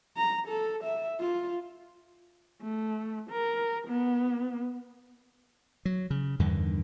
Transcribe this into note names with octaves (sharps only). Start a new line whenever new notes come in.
A#5
A4
E5
F4
A3
A#4
B3
F#3
C#3
E2 G2 D3 D#3